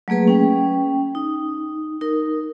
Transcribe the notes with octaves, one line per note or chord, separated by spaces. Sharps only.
F#3 A3 A#3 G#4 B4
C#4 G5
D#4
D#4 A#4